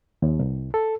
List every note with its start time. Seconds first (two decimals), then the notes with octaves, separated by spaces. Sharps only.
0.22 D#2
0.39 C2
0.74 A4